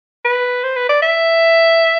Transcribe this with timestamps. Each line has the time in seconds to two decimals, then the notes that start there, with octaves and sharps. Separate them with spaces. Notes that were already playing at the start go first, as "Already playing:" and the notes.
0.25 B4
0.64 C5
0.76 B4
0.89 D5
1.02 E5